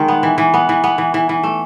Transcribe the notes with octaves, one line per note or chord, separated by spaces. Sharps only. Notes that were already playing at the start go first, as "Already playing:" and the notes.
Already playing: D#3 G#3
B3
E3
E3
B3
E3
B3
E3
E3
E3
A3